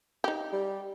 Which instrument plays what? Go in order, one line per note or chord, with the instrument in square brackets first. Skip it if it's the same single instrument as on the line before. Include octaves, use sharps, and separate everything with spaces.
[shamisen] D#4 G4
[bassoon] G3